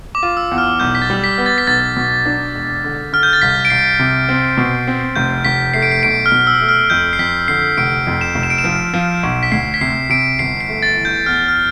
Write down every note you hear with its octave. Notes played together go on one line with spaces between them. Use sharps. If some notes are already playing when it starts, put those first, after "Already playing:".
D6
F4
E6
E2
F6
B1 G6
B6
A6
G3
B6
B3
A6
B6
B1 A6
B2
D4
E1
D3
D3 F6
G6
A6
C2 B6
D7
C2 C7
C3
C4
B2
C4
F1 G6
F1 B6
A3 C7
D7
C7
B1 D7
F6
B2
E6
A3
F6
F2 G6
C7
F2 B6
D3 C7
F1 D7
F2
E7
F1
E7
D7
E7
F3
F3
B1
B6
D2 C7
B6
C3 C7
C3 D7
G1 C7
C7
A3
A6
E3
G6
E2 F6
F6